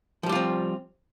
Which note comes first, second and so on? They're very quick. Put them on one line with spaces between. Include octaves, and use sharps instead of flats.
F3 G3 G4 F4 C4